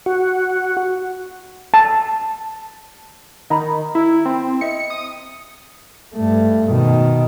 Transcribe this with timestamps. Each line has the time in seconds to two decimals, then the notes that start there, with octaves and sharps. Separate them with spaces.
0.06 F#4
1.74 A5
3.50 D#3 D#4 A#5 B5
3.95 E4
4.25 C4
4.61 D#5 E5 C#7
4.90 D#6
6.15 G2 A3
6.71 B2 D#3